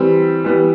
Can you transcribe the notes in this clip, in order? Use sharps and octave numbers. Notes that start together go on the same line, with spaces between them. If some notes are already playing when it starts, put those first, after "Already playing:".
Already playing: E3 G3 C4
E3 G3 B3